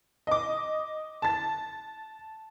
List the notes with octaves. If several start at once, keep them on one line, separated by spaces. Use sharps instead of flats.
D#5 D6
A5 A6